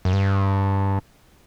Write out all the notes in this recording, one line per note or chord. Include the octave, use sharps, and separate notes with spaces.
F#2
G2